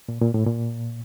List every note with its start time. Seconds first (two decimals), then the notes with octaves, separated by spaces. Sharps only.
0.09 A#2
0.22 A#2
0.34 A2
0.47 A#2